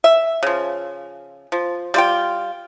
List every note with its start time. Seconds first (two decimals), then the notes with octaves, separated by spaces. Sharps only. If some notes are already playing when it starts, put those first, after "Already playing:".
0.04 E5
0.43 C#3 F3
1.52 F3
1.94 G3 F4 G5